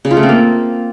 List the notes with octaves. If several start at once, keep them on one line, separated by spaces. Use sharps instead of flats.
C#3
F4
A3
C4
A#3